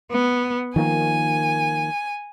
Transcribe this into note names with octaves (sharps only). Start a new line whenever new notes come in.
B3
D#3 F3 A#3 G#5